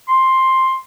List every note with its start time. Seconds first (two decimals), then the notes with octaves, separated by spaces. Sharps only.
0.08 C6